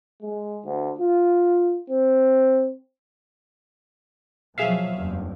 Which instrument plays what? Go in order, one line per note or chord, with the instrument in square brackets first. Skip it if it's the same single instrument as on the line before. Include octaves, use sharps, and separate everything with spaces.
[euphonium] G#3
D2
F4
C4
[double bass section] B2 F3 F#3 [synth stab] G#4 E5 F5
[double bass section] F#1 E2 G2